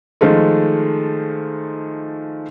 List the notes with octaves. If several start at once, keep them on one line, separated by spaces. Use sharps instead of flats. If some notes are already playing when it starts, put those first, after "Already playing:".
D#3 F3 G#3 A3